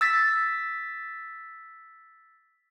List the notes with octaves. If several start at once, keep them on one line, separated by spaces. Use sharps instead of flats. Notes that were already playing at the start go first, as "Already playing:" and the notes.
E6 A6 B6